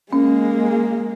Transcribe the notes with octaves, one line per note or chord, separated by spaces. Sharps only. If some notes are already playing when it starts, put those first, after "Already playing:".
G#3 A#3 C#4